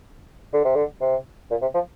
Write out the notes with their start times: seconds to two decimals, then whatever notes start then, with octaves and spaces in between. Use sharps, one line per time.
0.53 D3
0.64 C3
0.75 D3
1.01 C3
1.50 A#2
1.61 C3
1.74 F3